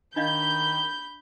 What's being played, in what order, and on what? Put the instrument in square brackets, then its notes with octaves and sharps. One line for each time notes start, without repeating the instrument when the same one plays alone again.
[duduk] D#3 [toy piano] D4 D#5 F5 [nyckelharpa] B5 [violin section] G6